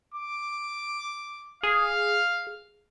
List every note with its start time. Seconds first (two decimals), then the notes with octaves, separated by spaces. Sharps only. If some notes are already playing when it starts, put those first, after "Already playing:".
0.14 D6
1.63 G#4 F5